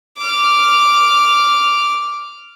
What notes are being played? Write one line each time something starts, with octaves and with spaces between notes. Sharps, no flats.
D6 F6